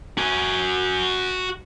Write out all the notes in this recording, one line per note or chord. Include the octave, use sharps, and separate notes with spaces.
F#4 G#5